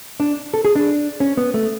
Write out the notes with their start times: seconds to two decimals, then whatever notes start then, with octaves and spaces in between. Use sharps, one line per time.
0.20 D4
0.54 A4
0.65 G#4
0.76 D4
1.20 C#4
1.37 B3
1.54 A3